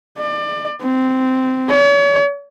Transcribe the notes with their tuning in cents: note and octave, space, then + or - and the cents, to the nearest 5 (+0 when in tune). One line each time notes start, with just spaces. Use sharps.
D5 +30
C4 -10
C#5 +40